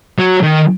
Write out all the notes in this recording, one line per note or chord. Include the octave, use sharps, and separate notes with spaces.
F#3
D#3